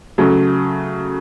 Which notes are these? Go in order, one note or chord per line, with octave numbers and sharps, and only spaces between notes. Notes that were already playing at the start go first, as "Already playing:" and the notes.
C#3 F#3 A3